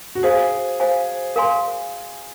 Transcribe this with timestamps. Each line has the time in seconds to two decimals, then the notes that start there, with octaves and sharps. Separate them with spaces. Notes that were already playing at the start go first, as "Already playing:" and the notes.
0.15 F#4
0.23 G#4 C5 F5 G#5
0.80 C5 F5 G#5
1.36 A#4 F5 G#5 C6